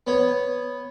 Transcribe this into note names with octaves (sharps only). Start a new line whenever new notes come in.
B3 C#5